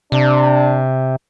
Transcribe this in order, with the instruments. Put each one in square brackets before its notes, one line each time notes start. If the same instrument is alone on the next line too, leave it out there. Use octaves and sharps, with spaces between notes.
[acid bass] C3 [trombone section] D4